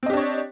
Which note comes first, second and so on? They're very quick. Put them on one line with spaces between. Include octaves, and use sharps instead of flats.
C4 D#5 G4 D4 C#5